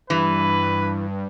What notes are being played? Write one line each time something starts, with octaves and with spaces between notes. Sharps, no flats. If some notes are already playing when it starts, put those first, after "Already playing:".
G2 E3 B4